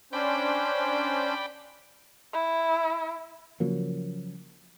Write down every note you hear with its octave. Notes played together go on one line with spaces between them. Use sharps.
C#4 D4 C5 D5 G5 B5
E4
C#3 F3 F#3 A#3